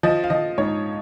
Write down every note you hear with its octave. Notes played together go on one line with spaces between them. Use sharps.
F3 D#5
F5
F3 D#5
G#2 C#5